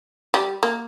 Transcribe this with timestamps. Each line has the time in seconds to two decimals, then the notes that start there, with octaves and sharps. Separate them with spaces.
0.34 G3
0.63 A#3